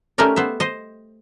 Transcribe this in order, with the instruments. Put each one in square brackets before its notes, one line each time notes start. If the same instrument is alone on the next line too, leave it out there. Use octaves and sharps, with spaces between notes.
[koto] A3 C#4 D#4 G4 A#4 D5
B3 C5 E5
C5 D#5